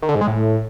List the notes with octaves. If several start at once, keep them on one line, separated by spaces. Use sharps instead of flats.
D#3
D3
G#2
G#3
A2